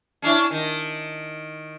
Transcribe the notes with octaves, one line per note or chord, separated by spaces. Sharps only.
C#4 D4 E4
D#3